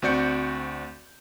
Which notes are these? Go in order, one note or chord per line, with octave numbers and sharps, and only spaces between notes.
D2 C4 F#4 D5 G6 C#7